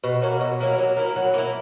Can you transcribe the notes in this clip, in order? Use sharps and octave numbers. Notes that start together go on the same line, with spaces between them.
B2
F#3 A#3 E4
B2
F#3 A#3 E4
F#3
A#3 E4
F#3
A#3 E4